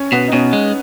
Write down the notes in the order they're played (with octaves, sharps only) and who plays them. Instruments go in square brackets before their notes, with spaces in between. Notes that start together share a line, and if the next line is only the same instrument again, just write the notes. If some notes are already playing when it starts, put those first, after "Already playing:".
Already playing: [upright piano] C#4
[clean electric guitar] B2 [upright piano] B3
[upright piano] D#4
[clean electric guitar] B2 [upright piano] C#4
[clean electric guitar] G#3